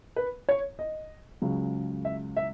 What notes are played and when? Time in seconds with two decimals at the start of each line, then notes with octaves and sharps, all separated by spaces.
0.16 B4
0.49 C#5
0.79 D#5
1.42 C#2 C#3 F#3
2.05 E5
2.37 E5